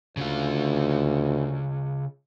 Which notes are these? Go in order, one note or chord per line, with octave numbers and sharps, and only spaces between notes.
D2 C#3 F4